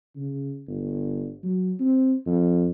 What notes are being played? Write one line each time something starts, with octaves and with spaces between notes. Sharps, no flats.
C#3
G1
F#3
C4
F2